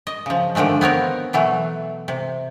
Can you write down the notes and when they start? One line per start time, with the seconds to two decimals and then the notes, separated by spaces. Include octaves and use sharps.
0.07 D#5
0.26 C#3 F3
0.55 D3 D#3 F3 G#3 A3
0.81 B3 C4 A#4 C#5
1.33 B2 E3 F#3 A3
2.08 C3